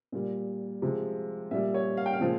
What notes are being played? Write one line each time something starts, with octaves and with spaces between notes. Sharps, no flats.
A#2 G3
C3 F3 G#3
A#2 G3 E5
C#5
F5
G5
F5
A#2 F3 G#3